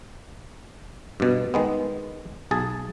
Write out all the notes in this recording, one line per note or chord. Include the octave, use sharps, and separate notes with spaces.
G2 B2
D#3 G#3 B3
B1 G#4 A5